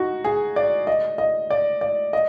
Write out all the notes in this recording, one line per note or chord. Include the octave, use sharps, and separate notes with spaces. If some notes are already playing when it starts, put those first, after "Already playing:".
Already playing: D#4 F#4
G#4
D5
D#5
D#5
D5
D5
D#5